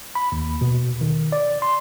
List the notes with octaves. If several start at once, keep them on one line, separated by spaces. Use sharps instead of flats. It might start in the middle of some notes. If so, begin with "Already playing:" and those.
B5
D#2
B2
D#3
D5
C6